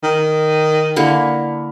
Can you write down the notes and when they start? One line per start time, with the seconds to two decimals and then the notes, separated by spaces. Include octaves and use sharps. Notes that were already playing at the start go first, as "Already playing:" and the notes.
0.03 D#3
0.96 D3 A#3 E4